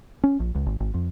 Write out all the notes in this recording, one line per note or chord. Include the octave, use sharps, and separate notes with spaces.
C#4
A#1
C#2
G#1
G#1
F2